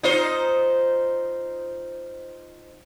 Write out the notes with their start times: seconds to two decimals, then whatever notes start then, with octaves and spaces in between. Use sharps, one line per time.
0.03 D#4 F4 C5